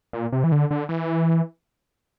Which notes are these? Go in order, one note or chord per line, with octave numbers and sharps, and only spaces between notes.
A#2
C3
E3
D3
D3
E3